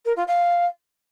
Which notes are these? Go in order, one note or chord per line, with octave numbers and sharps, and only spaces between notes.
A#4
F4
F5